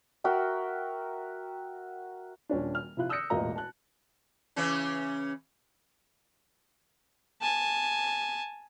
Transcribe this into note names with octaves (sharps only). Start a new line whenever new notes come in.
F#4 A#4 E5 G5
D#1 C#4 D4
F6
C3 F3 E4 F4 F#6
D#6 E6 F#6 G6 A#6 C#7
E1 A1 A#2 A#3 D#5 A#5
A5 F#6
C#3 E3 C#4
G#5 A5